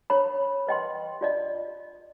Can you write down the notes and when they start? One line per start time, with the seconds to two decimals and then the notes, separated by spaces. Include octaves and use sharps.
0.10 C#5 B5
0.67 B4 D#5 G5 C6
1.21 F4 D5 D#5